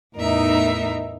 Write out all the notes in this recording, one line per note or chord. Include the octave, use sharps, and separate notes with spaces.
E2 A2 D#4 A#4 E5